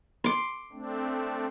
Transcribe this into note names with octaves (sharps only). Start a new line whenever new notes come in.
C6 D6
A3 C4 D4